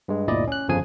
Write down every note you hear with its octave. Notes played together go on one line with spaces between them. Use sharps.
G2 G#3
G1 D2 A#2 E4 D5 D#5
C#4 F#6
G1 F2 C#3 F3 G#4 G#5